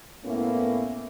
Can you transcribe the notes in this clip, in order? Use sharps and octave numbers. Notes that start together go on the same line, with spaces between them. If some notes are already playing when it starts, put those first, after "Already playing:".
A2 A#3 B3 C#4 E4